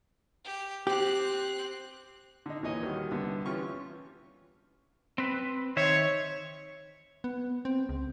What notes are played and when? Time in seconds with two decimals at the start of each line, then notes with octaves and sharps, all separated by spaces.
0.45 G4
0.87 C4 G4 F#6
2.46 D3 D#4
2.62 D#2 A#2 E3 C#5 D#5 G#5
2.83 D#3 G3 F#4
3.11 C2 D3 B3
3.46 E3 C#4 F4 G4 C#6
5.18 C4 B4
5.77 D#3 C5 C#5 E5
7.24 B3
7.65 C4
7.89 C#2